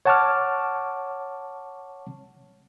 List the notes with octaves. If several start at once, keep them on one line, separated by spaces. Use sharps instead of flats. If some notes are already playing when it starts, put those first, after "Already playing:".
C#5 F#5 A5 C#6 D6 F6